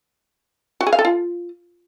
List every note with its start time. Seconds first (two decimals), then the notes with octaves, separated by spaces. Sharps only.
0.81 F#4
0.87 G#4
0.93 F5
0.99 A4
1.05 F4